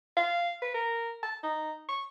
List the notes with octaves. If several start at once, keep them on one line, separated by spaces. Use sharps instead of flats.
F5
B4
A#4
A5
D#4
C#6